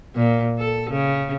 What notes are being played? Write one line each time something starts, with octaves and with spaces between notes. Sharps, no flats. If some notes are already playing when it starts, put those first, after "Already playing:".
A#2
A4
C#3